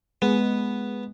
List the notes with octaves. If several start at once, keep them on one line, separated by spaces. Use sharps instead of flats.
G#3 B3